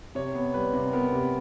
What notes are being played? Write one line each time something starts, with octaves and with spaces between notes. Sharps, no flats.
C3 C#5
B3
G3 B4
C3
B3 A#4
C3